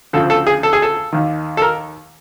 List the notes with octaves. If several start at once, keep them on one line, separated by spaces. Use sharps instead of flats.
D2 C#3 F3 A4
A4
G#4
A4
G#4
A4
D#2 D#3
A4
A#4